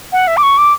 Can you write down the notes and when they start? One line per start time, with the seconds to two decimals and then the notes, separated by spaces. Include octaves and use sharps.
0.12 F#5
0.27 E5
0.37 D6
0.43 C#6
0.58 D6